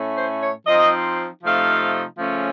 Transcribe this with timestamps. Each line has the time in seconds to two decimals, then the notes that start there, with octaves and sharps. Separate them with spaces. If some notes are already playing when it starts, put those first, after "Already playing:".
Already playing: A2 A3 C#4
0.17 C5
0.42 C#5
0.67 F3 C4 D#4 D#5
1.43 C3 F3 A3 D#4 F5
2.19 C#3 F3 A3 C#4